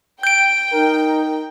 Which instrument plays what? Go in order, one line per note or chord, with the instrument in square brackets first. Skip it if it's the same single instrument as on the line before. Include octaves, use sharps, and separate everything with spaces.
[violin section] G5 [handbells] G6 D7
[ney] D#4 [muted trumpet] A#4